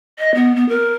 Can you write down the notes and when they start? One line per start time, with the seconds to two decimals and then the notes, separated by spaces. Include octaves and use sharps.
0.19 D#5
0.35 B3
0.56 B3
0.69 A#4